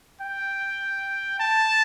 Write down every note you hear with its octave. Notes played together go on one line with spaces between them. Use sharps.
G5
A5